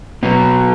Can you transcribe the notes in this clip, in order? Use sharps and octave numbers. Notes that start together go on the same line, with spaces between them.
B2 F#3 B3